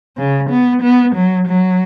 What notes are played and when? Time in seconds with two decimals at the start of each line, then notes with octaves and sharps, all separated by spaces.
0.17 C#3
0.50 B3
0.82 B3
1.15 F#3
1.47 F#3